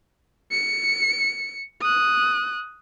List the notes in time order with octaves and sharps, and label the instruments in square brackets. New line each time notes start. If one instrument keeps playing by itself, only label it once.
[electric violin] C#7
D#6 F#6